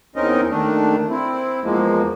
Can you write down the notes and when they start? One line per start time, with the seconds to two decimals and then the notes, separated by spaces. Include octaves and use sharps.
0.16 E2 C4 C#4 D#4 A#4 D#5
0.50 D#2 D#3 A3 D4
1.09 C4 E4
1.63 E2 F3 G#3 A#3